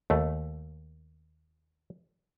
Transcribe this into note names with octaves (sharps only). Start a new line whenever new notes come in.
D#2 A3